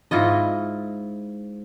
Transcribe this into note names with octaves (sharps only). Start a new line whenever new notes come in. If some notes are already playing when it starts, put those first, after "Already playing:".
G#2 E4 F4 D#5